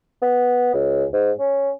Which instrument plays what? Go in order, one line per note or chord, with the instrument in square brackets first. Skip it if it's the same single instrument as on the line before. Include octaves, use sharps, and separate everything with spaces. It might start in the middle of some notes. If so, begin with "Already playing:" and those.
[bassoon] B3
C#2
G#2
C#4